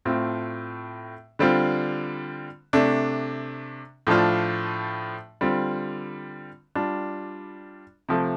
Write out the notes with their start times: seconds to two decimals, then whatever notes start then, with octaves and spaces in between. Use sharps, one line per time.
0.05 A2 A3 C4 F4
1.39 D3 G3 C4 F4
2.73 C3 A3 D4
4.07 A2 F3 D4 F4
5.41 D3 G3 C4 F4
6.75 G3 D4 F4
8.09 C3 F3 A3